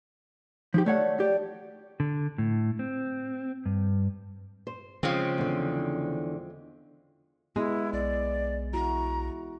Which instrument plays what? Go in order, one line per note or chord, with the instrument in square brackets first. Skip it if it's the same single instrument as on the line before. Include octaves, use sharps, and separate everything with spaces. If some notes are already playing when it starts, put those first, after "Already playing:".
[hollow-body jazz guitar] F3 G4 [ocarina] D#4
[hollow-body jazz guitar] A3 C#5 F#5 [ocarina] D5
[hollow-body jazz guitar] G4 [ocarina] D5
[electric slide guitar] D3
A2
C4
G2
[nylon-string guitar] C5
[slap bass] C#3 [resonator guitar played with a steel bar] F3 G#3 C4
[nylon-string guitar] E2 D3
[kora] G#3 [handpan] B3 [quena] E4
[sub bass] B1 [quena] D5
[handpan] E4 F#4 [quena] A#5